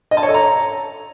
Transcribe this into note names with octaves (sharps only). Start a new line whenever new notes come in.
D#5
A5
C#5
A4
A#5